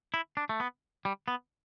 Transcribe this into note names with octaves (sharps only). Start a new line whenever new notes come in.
E4
D4
A3
B3
G3
B3